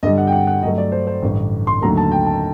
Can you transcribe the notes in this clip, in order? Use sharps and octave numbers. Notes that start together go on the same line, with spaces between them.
G2 D3 G3 D#5
F#5
G5
F#5
F#5
G2 F#3 A3 D#5
D5
C5
C5
A1 G2 D3
C6
D#2 D3 F#3 A3 A#5
A5
G5
A5